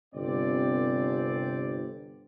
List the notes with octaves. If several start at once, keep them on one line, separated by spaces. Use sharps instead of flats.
G1 C3 C4 D5